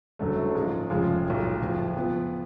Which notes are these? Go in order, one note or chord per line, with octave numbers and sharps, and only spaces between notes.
F#1 F#2 D3 F#3 A3
G#2 F3 G#3 C#4
F1 F2 C#3 F3 G#3
B1 A2 F3
F#1 F2 F3
F2 F3 B3